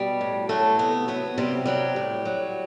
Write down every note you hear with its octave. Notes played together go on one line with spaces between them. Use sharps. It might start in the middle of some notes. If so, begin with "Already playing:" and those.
Already playing: B2 G3
A2
F#3 A3
C3 B3
F#3 B3
C3 G3
F#3 G3
A2
F#3